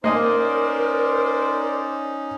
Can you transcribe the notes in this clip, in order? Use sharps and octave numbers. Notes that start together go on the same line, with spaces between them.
A#3 C#4 D#4 A#4 C5 D5 D#5 G#5